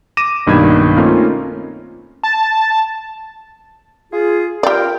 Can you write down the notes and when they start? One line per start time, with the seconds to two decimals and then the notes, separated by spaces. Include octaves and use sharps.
0.17 D6 A#6 D#7 E7
0.47 B1 G2 D#3 A#3 B5 G#6
0.97 A3 A#3 C4 C#4 D#4 F4
2.23 A5
4.12 F4 G#4
4.63 F4 G4 A#4 D5 G5